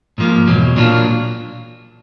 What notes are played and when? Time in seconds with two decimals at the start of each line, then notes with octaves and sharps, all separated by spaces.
0.18 G#2 F3 A#3
0.47 E2 B2 F#3
0.76 A#2 F#3 A#3 D4 F4